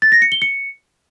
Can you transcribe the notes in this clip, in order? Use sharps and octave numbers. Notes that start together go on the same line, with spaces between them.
A6
A#6
C#7
G7
C#7